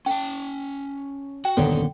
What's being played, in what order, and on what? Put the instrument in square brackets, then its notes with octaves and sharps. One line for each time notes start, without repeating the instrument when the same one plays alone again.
[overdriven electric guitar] C#4 A5 [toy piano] G5
[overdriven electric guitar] F#4 [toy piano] G5
[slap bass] D#1 F#2 B3 [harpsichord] D3 [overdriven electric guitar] D#3